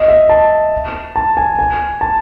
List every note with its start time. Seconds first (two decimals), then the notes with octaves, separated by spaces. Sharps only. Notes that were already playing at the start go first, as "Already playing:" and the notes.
Already playing: D#5
0.08 E5
0.29 A5
1.16 A5
1.37 G#5
1.59 G#5
2.01 A5